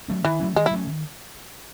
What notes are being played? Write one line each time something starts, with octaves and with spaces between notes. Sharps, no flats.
F#3 A3 C#4
D#3 E3
F#3 A3 C#4
D#3 G#3
E4
F#3 A3 C#4
D#3